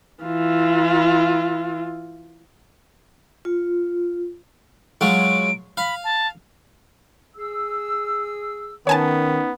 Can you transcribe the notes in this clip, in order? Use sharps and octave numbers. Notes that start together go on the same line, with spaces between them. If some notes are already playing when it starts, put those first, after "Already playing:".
E3 F4
F4
F#3 G#3 F4 D7
F5 B5
A5
G#4 E6
D#3 B3 C#4 D#4 C#5 G#5 A5